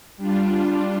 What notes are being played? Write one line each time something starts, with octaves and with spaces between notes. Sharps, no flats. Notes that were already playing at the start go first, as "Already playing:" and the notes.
G3 D4 F4